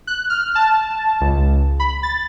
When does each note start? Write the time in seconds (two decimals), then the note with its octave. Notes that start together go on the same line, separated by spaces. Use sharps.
0.07 F#6
0.30 F6
0.55 A5
1.21 C#2
1.80 B5
2.03 A6